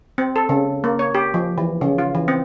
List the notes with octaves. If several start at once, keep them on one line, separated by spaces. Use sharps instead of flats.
C4
A4
C#3
A#3
C#5
G4
F3
E3
C#3
F4
E3
C4